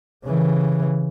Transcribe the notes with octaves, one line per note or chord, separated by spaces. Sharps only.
C#3 E3